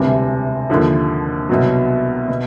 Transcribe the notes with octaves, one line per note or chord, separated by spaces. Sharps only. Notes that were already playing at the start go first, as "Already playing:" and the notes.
Already playing: E1 D2 C3 E3 G3
D#2 D3 F3
C2 B2 F#3
B2